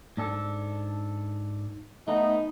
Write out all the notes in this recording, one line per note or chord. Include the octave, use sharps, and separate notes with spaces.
G#2 D4 A4
A3 B3 D#4